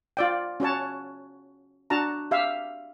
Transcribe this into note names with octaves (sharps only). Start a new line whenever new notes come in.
F4 D5 G5
C#4 F#4 C#5 A5
D4 F#4 A5 A#5
G4 E5 F5